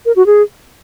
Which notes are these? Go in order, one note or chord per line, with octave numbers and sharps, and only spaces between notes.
A#4
F#4
G#4